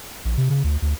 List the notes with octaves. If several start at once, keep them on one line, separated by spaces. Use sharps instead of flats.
A#1
C3
C#3
D2
D2